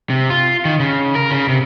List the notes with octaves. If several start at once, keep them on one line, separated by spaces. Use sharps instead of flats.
C3
F4
D#3
C#3
A#4
C#3
C3